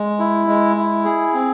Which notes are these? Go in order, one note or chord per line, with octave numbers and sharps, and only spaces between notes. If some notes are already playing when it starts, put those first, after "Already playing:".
Already playing: G#3
E4
G#3
E4
G#4
C4